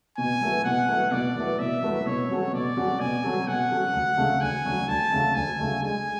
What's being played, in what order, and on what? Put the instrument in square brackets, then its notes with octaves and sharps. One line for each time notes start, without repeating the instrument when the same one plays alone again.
[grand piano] B2 [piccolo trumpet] G#5
[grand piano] F#3 A3 E4 B4
[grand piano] B2 [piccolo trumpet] F#5
[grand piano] F#3 A3 E4 B4
[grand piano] B2 [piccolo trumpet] D5
[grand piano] F#3 A3 E4 B4
[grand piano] B2 [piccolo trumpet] E5
[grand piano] F#3 A3 E4 B4
[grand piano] B2 [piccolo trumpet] C#5
[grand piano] F#3 C#4 F#4 A4
[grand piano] B2 [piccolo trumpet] D5
[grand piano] F#3 C#4 F#4 A4
[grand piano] B2 [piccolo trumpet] G#5
[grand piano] F#3 C#4 F#4 A4
[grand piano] B2 [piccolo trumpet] F#5
[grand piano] F#3 C#4 F#4 A4
D2
C#3 F#3 A3 D4
[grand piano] D2 [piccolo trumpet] G#5
[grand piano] C#3 F#3 A3 D4
[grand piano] D2 [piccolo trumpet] A5
[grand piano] C#3 F#3 A3 D4
[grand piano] D2 [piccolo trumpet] G#5
[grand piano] C#3 F#3 A3 D4
[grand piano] G#3 [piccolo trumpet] G#5